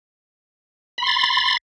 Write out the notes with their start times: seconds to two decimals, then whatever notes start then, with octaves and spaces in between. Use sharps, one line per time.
0.98 B5
1.02 C6
1.07 A6